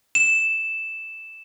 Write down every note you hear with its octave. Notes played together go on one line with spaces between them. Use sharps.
E7